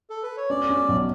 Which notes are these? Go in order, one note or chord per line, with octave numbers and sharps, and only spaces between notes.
A4
B4
C#5
C#4 D5
C#4
B1